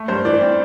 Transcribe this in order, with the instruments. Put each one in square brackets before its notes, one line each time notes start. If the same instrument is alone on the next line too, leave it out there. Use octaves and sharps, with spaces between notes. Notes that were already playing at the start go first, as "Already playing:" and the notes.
Already playing: [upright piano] A3
G2 C5
E3 D5
C4